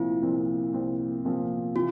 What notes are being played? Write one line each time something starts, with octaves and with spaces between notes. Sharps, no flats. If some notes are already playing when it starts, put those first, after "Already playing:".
Already playing: C2 A#2 F3 C4 E4
C2 A#2 F3 C4
C2 A#2 F3 C4
C2 A#2 F3 C4
C3 E3 F4